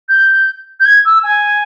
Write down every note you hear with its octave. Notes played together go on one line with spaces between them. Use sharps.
G6
G6
G#6
E6
G#5